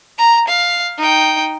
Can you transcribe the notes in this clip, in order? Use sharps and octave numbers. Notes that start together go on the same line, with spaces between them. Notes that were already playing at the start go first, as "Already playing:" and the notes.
A#5
F5
D#4 G5